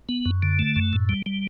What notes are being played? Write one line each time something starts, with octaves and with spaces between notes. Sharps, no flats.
B3
F#2
D3
A3
F#2
A2
G3
G3